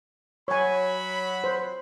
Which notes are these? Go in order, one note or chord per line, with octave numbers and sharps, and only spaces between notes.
F#3 C#5 G#5 B5
C5